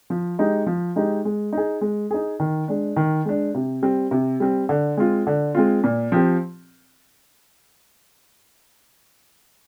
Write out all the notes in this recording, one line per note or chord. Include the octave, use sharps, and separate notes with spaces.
F3
G#3 D#4 G4
F3
G#3 D#4 G4
G#3
D#4 G#4
G#3
D#4 G#4
D#3
G#3 D4
D#3
G#3 D4
C3
G3 C4
C3
G3 C4
D3
G#3 C4 F4
D3
G#3 C4 F4
A#2
F3 C4 G4